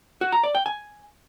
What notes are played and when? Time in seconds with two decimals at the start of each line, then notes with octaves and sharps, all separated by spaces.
0.21 F#4
0.32 A#5
0.43 D5
0.55 G5
0.66 G#5